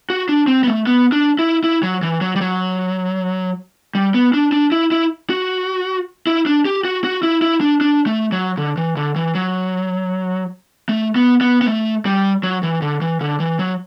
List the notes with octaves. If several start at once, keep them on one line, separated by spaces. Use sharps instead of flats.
F#4
D4
C4
B3
A3
B3
D4
E4
E4
F#3
E3
F#3
G3
F#3
G3
B3
D4
D4
E4
E4
F#4
E4
D4
G4
F#4
F#4
E4
E4
D4
D4
A3
F#3
D3
E3
D3
E3
F#3
A3
B3
B3
B3
A3
G3
F#3
E3
D3
E3
D3
E3
F#3